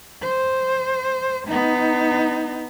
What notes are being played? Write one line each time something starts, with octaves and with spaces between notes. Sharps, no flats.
C5
B3 D#4